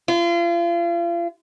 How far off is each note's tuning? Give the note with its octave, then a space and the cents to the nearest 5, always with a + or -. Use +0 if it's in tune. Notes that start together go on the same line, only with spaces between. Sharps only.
F4 -35